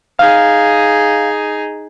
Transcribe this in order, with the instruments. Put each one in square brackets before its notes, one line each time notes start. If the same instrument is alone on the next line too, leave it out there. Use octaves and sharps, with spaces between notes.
[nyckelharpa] D#4 G#4 [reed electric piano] F5